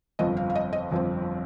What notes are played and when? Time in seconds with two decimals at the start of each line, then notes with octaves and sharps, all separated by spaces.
0.19 G1 F2 F3 C4 D#5
0.37 F5
0.50 F5
0.55 D#5
0.73 D#5
0.91 G1 F2 F3 C4